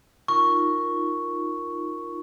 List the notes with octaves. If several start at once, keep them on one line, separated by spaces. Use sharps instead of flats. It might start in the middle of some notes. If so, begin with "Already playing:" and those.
D#4 F4 A#4 C#6